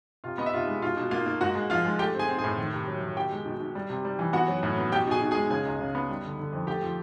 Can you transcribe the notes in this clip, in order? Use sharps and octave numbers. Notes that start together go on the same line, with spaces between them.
C3 F4 F5
B3 D#5
E5
C3 F4 F5
G#3
B2 F4 F5
B2
A#3 F4 F5
A#3
G#2 F#4 F#5
G#3
F3 F4 F5
G#3
A3 G4 G5
C4
G#4 G#5
C4
G#4 G#5
A2
D#3
C3
F#3
D#3
B2 G4 G5
G#3
B2
B2
G3
C3
G3
E3
B3 F#4 F#5
F#3
A2
B3
B2 G4 G5
B2 G#4 G#5
B2
G#4 G#5
G#3
C#3 G#4 G#5
C#2
C#3
B3
G3
D3
D3
F2
A3 G4 G5
F3